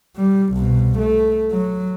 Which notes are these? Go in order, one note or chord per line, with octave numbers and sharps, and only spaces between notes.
G3
C2 B2
A3
F#3